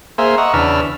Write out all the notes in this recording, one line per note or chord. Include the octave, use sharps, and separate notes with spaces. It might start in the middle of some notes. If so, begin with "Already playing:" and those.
A#3 G#4 C5 E5 F5
D#5 F#5 A#5 C#6 E6
E2 C#3 D4 B4 E6 F6